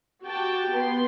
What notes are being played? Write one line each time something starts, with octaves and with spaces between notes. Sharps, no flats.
F#4 G4 G5 A5
B3 C6